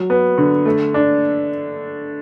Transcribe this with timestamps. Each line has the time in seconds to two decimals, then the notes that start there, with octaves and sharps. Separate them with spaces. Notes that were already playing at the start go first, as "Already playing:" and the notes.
Already playing: F#3
0.10 B3
0.38 D3
0.66 A3
0.94 D4